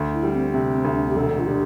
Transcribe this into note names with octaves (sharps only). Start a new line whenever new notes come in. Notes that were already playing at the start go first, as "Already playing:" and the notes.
Already playing: D2
E4
G3
C4
C3
C4
D2
D4
G4
E1 A4
F4
D3 G4